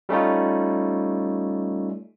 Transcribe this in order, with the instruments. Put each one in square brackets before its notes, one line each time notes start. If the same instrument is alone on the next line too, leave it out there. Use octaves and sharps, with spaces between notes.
[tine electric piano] G3 A3 C#4 D#4 F4